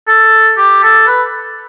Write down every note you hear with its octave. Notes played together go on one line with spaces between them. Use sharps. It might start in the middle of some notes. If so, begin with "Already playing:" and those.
A4
G4
A4
B4